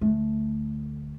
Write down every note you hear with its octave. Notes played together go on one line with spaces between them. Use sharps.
D2 A3